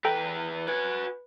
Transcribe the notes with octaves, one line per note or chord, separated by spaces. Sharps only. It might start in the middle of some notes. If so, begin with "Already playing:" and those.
E2 A4 B4 G5 A#5
F#4 B4 G#5